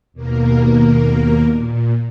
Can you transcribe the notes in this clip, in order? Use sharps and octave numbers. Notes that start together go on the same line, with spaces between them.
D#2 B2 A#3 A#4
A#2